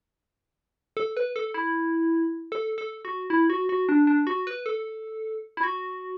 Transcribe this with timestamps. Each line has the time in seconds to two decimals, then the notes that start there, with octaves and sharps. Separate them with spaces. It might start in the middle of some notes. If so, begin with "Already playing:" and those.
0.97 A4
1.17 B4
1.36 A4
1.54 E4
2.52 A4
2.78 A4
3.05 F#4
3.30 E4
3.50 F#4
3.69 F#4
3.89 D4
4.07 D4
4.27 F#4
4.47 B4
4.66 A4
5.57 E4
5.63 F#4